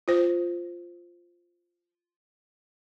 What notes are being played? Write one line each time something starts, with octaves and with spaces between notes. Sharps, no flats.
F4 C5